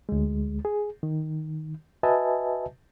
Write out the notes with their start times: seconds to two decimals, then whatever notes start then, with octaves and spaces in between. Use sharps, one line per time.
0.09 D2 G#3
0.65 G#4
1.03 D#3
2.03 F#4 B4 D#5 E5 G#5 A5